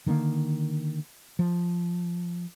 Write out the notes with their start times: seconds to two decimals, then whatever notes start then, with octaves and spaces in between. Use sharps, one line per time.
0.06 D3 D#3 A3 A#3
1.39 F3